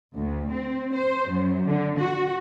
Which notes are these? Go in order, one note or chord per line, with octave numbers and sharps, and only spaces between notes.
D2
C4
C5
F#2
D3
F#4